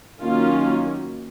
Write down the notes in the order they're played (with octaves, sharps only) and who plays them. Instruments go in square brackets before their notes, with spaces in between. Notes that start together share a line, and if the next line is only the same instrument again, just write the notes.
[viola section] D#3 F#3 A#3 C#4 F4